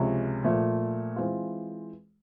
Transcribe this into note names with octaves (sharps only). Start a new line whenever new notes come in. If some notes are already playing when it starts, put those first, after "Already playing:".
Already playing: C#2 C3 F3 G#3 C#4
A#2 F3 A3
E3 G#3 C4 F4